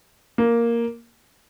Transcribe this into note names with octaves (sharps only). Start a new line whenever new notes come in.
A#3